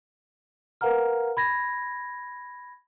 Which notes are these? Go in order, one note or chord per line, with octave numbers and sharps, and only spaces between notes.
A#4 B4 F5 F#5 A#5 F6
B5 G#6 A#6